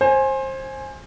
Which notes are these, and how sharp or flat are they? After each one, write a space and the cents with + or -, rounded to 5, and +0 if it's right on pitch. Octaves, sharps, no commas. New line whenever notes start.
C5 +25 G#5 +0